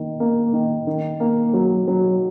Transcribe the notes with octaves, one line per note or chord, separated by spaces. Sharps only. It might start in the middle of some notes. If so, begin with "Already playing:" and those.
Already playing: D#3 A#3
A#3
D#3
D#3
A#3
F#3
F#3